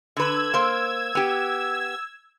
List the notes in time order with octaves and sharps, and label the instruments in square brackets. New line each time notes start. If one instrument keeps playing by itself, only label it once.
[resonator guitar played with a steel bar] D3 B4 [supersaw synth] E6 G#6
[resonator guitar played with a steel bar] A#3 C5
B3 G4